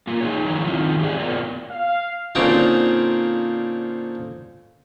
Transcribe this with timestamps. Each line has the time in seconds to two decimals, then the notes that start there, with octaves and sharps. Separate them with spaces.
0.07 A#3 F4
0.21 D#4 G#4 C#5
0.45 D#3 F3 E4 C#5 A#5
0.65 D#3 C4 D#4 F4
1.00 G4 G#4 B4 C5 D5
1.20 B3 F4 A#4 C#5 D5
1.68 F5
2.35 A#2 D3 C4 C#4 D#4 F4